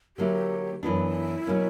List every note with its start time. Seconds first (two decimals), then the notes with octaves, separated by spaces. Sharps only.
0.17 D3 F#3 A#3 E4 G4
0.83 F#2 E3 B3 D4 E4 F#4
1.47 B2 F#3 A#3 C#4